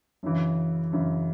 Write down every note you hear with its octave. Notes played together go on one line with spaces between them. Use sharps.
F#2 C#3 E3
F#2 C#3 E3